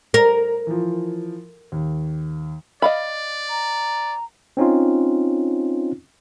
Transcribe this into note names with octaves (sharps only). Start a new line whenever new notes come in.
A#4 A#5
E3 F3
D#2
D5 D#5 F5 B5
A#5
C4 C#4 D#4 F4